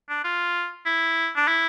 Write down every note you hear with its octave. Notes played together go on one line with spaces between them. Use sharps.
D4
F4
E4
D4
E4